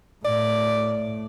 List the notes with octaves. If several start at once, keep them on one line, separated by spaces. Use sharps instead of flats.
A2 D5